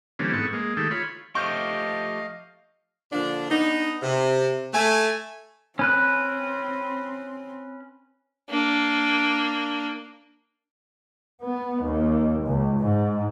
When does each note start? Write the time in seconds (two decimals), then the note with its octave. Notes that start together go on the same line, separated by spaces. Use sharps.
0.19 D3 E3 G3 A#3 C4 C#4
0.33 G#2 B3 A4 C#6
0.53 G#3 A#3
0.77 D#3 G#3 A3 G4 A4
0.91 F4 C#5 B5
1.35 F3 A3 G4 D#5 F5 C#6 G6
3.12 A#2 D3 F3 D4
3.50 B3 D4 D#4
4.02 C3
4.74 A3 G#5
5.79 C4 C#4 B4 F#6
8.50 A#3 D4
11.41 B3
11.84 D#2
12.44 C#2
12.79 G#2